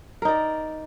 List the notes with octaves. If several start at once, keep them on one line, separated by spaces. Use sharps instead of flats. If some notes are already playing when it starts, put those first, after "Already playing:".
D#4 A#4 D5